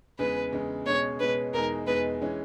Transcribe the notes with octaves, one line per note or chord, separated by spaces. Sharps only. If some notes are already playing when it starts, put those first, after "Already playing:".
E2 C#3 G#3 B4
E2 C#3 G#3
B2 G#3 C#4 C#5
B2 G#3 C#4 B4
E2 B2 G#3 D#4 A#4
E2 B2 G#3 D#4 B4
E3 G#3 C#4